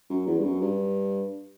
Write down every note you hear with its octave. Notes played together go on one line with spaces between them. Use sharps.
F#2
E2
G2
F#2
G2